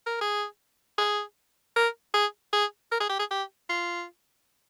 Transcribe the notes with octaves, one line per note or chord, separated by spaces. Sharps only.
A#4
G#4
G#4
A#4
G#4
G#4
A#4
G#4
G4
G#4
G4
F4